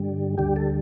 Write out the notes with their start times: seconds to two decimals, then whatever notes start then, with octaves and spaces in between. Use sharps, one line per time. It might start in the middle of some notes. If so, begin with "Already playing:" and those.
Already playing: G2 D3 G3
0.38 D2 D3 G3 G4
0.56 A4